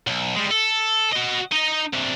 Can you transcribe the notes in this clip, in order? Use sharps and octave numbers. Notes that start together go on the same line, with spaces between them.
B1
G3 G#3
A4
F#4 D#5
D#4 D#5
C3 D4